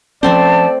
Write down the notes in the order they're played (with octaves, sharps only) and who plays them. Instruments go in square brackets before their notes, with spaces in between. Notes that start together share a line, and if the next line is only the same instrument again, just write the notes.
[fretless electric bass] F3 C#4 [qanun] A3 C4 C5 [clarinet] D5 [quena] A5